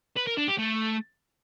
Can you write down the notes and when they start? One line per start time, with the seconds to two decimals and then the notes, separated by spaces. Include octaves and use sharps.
0.17 B4
0.27 A#4
0.38 D4
0.48 G4
0.59 A3